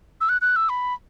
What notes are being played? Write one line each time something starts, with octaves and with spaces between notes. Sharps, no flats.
E6
F#6
F#6
E6
B5